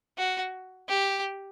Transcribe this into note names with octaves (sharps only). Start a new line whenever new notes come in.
F#4
G4